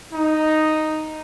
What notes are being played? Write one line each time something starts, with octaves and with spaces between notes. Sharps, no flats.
D#4